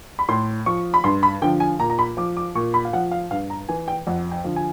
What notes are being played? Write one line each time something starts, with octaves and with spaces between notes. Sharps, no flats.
B5
A2 C6
F3 C#6
B5
G2 C6
B5
D3 F3 G5
G#5
A#2 A#5
A#5
B5
F3 D6
D6
A#2 C#6
B5
F5
F3 F#5
F5
G2 F5
A#5
E3 G#5
G5
F2 F#5
G5
D3 F3
G#5